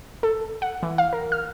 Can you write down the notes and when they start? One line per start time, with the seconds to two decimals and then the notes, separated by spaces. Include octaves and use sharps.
0.23 A4
0.62 F#5
0.83 E3
0.98 F5
1.13 A#4
1.32 F6